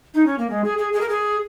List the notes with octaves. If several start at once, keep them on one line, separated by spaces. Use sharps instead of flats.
D#4
C#4
A#3
G#3
G#4
G#4
G#4
A#4
G#4